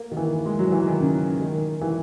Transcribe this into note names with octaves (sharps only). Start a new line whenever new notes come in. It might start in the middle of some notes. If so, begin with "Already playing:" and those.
Already playing: A#3
D#3
E3
G#3
F#3
E3
D#3
C#3
D#3
E3